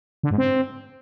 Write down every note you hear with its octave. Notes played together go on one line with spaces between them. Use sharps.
D3
G#2
C4